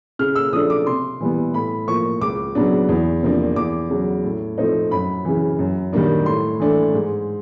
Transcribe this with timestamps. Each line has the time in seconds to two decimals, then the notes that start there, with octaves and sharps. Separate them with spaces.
0.19 C#3 F6
0.36 E6
0.53 F3 A3 D4 D#6
0.70 D6
0.86 C3 C6
1.20 E3 G3 B3
1.54 A2 B5
1.87 F3 A#3 C#6
2.21 C#2 D6
2.55 C#3 F#3 B3 D4
2.89 E2
3.22 C3 F3 A#3 D4
3.56 E2 D6
3.90 C#3 F#3
4.24 A2
4.58 F3 A3 C4 D#4
4.91 F#2 B5
5.25 C#3 E3
5.59 F#2
5.93 D#3 G3 A#3 D4
6.26 A2 C6
6.60 E3 A3 D4
6.93 G#2